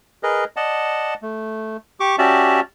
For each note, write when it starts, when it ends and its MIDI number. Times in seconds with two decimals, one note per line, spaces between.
0.23 0.44 68
0.23 0.44 70
0.23 0.44 71
0.23 0.44 75
0.56 1.14 74
0.56 1.14 75
0.56 1.14 78
0.56 1.14 81
1.22 1.77 57
2.00 2.16 67
2.00 2.16 85
2.00 2.16 86
2.18 2.60 61
2.18 2.60 66
2.18 2.60 67
2.18 2.60 74
2.18 2.60 76
2.18 2.60 81